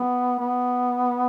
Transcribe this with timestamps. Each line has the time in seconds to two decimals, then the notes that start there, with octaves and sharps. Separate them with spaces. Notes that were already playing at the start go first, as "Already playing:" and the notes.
Already playing: B3
0.39 B3